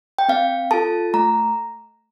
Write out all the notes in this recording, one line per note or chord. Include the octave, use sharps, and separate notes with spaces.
G5
C4 F5
F4 A4 A5
A3 A#5